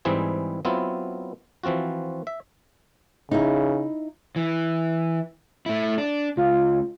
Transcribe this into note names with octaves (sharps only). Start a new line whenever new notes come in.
G#2 E3 G3 C4 E4 G#4
F#3 B3 C4 E4 F4
E3 F3 C4 F4 F#4
E5
C#3 D#4 E4
E3
A3 E4
D4
C#2 F4